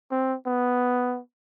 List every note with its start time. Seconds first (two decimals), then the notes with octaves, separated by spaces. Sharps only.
0.11 C4
0.46 B3